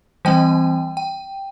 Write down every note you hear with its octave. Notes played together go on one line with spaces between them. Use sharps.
E3 G3 C4 G5
G5